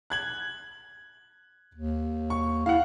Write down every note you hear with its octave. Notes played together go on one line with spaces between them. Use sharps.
F#6 G#6 F#7
D#2
C#6
E4 F5 F#5